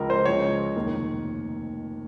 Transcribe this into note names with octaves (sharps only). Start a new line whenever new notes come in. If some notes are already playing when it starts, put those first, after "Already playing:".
Already playing: C#2 C#3 F3 A#4
C5
C#2 C#3 F3 C#5
F1 D#2 D#3